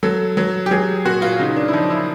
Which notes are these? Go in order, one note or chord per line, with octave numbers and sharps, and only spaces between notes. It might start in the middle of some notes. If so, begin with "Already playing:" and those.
F#3 A4
F#3
G4
F#3 G#4
A#2 F#4
F4
C#3 D#4
D4
E4
F3 D#4
E4